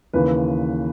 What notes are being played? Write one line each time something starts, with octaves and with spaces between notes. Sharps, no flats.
D#2 C#3 E3 B4